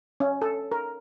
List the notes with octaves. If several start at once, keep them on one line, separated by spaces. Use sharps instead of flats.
C#4
A4
A#4